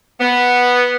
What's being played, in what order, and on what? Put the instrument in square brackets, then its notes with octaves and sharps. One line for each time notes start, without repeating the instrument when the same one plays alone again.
[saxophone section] B3